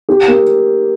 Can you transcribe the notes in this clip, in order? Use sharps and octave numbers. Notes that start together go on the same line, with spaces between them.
G4
A#3